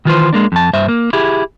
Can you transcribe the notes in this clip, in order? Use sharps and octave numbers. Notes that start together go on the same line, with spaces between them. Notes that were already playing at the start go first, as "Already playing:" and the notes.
D#3 E3 F4 G4 B4 C5
G#3 A#3 D4
F2 A5
G2 C5 E5
A#3
E4 G4 G#4